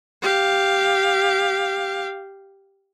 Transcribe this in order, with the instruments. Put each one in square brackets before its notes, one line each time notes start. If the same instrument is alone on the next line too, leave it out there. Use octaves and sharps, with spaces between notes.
[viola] G4 F5